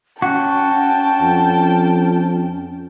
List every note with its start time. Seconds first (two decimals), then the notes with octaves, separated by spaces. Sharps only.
0.22 C#4 F#4 G5 A5
1.22 F2